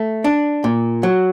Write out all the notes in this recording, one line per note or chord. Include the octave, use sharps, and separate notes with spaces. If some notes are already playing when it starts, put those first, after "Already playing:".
Already playing: A3
D4
A#2
F#3